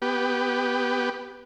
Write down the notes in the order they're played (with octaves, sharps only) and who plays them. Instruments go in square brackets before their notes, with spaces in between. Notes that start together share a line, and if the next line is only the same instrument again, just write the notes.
[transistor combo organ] B3 G4